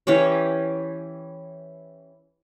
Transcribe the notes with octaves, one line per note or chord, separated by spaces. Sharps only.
E3 C#4 G4 C#5